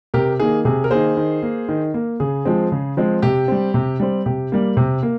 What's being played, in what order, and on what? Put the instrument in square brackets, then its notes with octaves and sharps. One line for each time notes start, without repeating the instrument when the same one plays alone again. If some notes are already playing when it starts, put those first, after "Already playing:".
[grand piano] C3 G4 A#4
D#3 A#3 G#4
C3 G#4
A#4
D#3 A#3 G#4 C5
D#3
A#3
D#3
A#3
C#3 G#4
F3 G#3 C4
C#3
F3 G#3 C4
C3 G4
G3 C4
C3
G3 C4
C3 G4
G3 A#3
C3
A#3